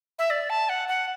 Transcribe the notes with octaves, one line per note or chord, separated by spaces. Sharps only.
E5
D5
A5
F#5
F#5